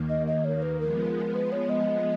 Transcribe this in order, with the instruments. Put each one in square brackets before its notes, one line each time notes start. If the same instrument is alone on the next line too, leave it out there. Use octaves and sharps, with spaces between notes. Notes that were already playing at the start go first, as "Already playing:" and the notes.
Already playing: [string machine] D#2 D#3 A#3
[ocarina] D#5
D#5
C#5
B4
[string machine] F3 G#3 B3 [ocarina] A#4
[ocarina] B4
C#5
D#5